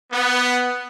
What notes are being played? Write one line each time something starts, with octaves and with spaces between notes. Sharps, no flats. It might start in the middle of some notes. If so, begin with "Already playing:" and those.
B3